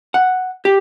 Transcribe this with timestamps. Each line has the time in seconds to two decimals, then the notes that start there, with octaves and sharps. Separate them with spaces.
0.14 F#5
0.65 G4